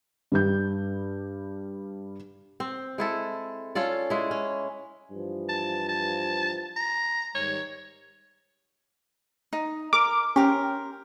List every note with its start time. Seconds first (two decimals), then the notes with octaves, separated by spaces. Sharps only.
0.32 G2 G3 G6
2.60 C4
2.98 G#3 E4 A4
3.75 C#4 F4 A4 D5
4.10 G#3 E4
4.31 C#4
5.11 G2 E3 F3
5.49 A5
5.89 A5
6.76 A#5
7.35 G#2 D#3 G3 C#5
9.53 D#4
9.93 A#4 D6
10.36 C#4 G4 A#4 C5